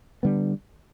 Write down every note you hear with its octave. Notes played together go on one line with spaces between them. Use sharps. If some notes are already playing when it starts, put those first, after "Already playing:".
D3 G3 B3